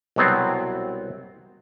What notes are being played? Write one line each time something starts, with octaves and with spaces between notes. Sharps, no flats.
C2 B2 F#3 B3 C4